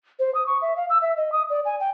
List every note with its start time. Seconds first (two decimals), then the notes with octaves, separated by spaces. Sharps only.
0.19 C5
0.35 D#6
0.47 C#6
0.62 E5
0.76 F5
0.90 E6
1.02 E5
1.17 D#5
1.32 D#6
1.50 D5
1.65 G#5
1.80 G5